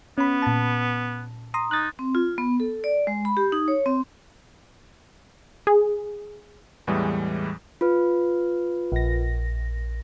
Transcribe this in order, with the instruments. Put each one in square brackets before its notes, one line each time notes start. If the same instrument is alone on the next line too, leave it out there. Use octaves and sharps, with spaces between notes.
[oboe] B3 [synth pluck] C#4 B5
[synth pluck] A#2 A5
A#5 C6 D#6
[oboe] D#4 [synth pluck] F#6 A6
[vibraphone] C4
F4
B3
A4
D5
G#3
B5
G4
D#4
C#5
C4
[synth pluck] G#4
[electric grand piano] E2 A2 E3 G3 G#3 D#6
[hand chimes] F4 B4
[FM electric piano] A#1 A#6